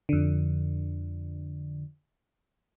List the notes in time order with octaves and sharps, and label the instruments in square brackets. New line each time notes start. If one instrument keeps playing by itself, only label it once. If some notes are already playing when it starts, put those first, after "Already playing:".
[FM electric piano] F2 D3